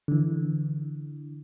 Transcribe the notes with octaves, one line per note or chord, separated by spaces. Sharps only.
D3 E3